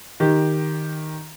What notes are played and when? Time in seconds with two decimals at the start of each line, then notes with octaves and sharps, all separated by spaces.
0.20 D#3 G4